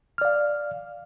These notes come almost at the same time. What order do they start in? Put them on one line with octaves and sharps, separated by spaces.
F6 D5 F5